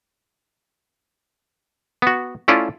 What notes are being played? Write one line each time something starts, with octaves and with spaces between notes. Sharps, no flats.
B3 F#4
A3 C#4 E4 F4 D5